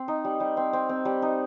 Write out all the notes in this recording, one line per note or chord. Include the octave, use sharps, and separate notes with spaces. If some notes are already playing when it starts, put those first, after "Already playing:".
Already playing: C4
D#4
G3
G3
C4
C4
C4
G3
D#4